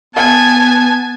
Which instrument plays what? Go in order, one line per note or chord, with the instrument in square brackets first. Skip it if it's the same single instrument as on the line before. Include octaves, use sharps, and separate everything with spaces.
[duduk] B3 [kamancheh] G#5 A5